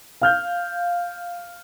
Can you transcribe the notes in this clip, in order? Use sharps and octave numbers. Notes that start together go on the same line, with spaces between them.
F5 F6 G6